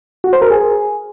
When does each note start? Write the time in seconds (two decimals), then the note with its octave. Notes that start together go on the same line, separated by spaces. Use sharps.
0.24 F#4
0.33 C5
0.42 A#4
0.50 G#4